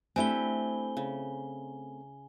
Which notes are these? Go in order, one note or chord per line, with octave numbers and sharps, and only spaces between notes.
A3 C4 D4 E4 G4 G#5 G7
C#3